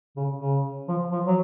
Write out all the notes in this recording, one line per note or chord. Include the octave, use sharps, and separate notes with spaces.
C#3
C#3
F3
F3
F#3